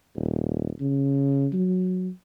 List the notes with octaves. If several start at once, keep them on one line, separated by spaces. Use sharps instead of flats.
D#1
C#3
F#3